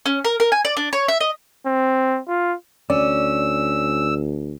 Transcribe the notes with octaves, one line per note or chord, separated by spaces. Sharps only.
C#4
A#4
A#4
G#5
D5
D4
C#5
E5
D#5
C4
F4
D2 C#4 D5 E6